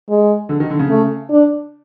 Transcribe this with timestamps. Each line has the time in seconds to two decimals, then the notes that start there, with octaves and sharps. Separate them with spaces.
0.10 G#3
0.49 D3
0.60 D#3
0.70 D3
0.79 C#3
0.90 A3
1.30 D4